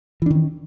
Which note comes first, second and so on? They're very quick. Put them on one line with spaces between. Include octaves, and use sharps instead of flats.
E3 D4 D#3 C#4